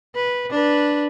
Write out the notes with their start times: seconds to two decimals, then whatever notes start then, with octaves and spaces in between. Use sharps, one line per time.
0.16 B4
0.51 D4 B4